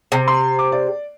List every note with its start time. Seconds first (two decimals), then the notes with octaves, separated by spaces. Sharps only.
0.12 C3
0.28 C6
0.59 D6
0.72 D5